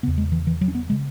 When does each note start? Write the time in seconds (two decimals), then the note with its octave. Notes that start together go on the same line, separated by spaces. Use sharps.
0.03 E2 C#3 B3
0.18 G#3
0.32 E3
0.47 E3
0.61 F#3
0.68 C#4
0.75 B3
0.90 C#3 G#3